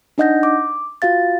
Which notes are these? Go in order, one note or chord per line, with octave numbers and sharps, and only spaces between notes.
D4 D#4 D#5 F#5 G6 A#6
D6
F4 F#4 F5 A6